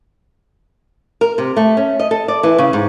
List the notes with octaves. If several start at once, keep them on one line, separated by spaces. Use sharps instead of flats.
A#4
C3
A3
C#4
D#5
A4
D5
E3
C#3
G#2